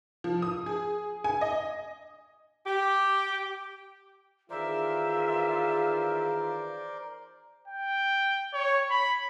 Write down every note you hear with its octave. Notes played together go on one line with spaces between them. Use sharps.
F3
D#6
G#4
G#5
D#5
G4
D#3 E3 F4 G#4 A#4 C5 D5 E5
G5
C#5
B5